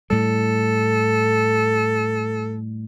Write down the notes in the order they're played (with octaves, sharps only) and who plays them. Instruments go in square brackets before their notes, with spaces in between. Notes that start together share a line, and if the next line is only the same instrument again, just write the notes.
[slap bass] A2 G3 [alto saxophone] A4